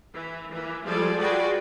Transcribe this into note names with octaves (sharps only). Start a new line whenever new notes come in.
E3
E3 A#3
F3 G3 G#3 G#4 A4 D5
F4 F#4 G#4 B4 D5 G5